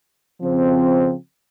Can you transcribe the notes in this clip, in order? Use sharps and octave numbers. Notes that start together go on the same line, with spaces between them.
C#3 F3 C4